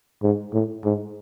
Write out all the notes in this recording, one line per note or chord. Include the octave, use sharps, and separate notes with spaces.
G#2
A2
G#2